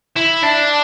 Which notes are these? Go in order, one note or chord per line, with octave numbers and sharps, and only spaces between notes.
E4
D4